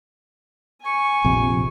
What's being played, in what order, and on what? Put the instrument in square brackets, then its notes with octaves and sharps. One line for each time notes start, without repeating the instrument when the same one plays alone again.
[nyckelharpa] G#5 C#6
[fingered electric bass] A#1 F2 C3